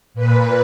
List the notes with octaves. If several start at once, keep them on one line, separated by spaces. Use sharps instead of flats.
A#2 B4